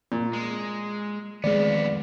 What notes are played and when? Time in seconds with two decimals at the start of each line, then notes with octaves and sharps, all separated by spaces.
0.12 A#2
0.33 G#3
1.44 F2 D#3 G#3 B3 G#4 D5